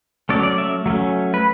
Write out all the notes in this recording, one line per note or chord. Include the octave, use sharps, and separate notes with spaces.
F#3 A3 C#4 D5
D5
E5
F#3 A3 C#4
B4